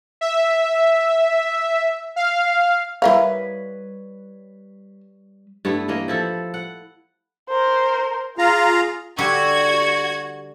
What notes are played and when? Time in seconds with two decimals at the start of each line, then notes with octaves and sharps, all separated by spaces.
0.21 E5
2.16 F5
3.02 G3 E4 A#4 B4 C#5 F5
5.65 G2 A3 B3 E4
5.88 E3 A#3 D#5
6.08 F3 E4 A4
6.54 F#5
7.49 A#4 C5
8.38 F4 G#4 F5 A#5
9.18 D3 G3 F#4 G4 C#6 G#6